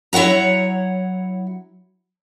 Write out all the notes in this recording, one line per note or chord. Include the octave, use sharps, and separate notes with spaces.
F#3 E4 C#5 F#5 A#5